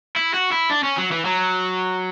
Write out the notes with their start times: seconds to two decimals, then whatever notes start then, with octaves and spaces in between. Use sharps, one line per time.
0.16 E4
0.34 F#4
0.52 E4
0.71 D4
0.84 C#4
0.98 F#3
1.12 E3
1.25 F#3